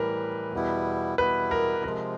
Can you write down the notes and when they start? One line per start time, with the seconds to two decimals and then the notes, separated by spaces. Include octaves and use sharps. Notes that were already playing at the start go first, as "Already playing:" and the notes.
Already playing: A2 E3 G3 A#4 B4
0.53 E2 B2 G3 B3 E4
1.18 E2 B2 G3 B3 E4 B4
1.51 A#4
1.83 C3 F3 G#3 A#4